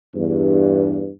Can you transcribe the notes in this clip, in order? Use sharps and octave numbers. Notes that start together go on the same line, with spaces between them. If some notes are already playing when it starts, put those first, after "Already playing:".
E2 G2